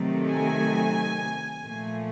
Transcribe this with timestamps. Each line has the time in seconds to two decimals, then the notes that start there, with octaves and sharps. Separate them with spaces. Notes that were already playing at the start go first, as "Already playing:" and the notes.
Already playing: C3 D#3 F#3 A3
0.30 G#5
1.63 A#2 F3 A3